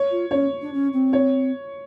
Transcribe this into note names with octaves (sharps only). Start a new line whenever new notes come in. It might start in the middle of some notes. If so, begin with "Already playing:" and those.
Already playing: C#5
F4
C#4 C#5
D4
C#4
C4
C#5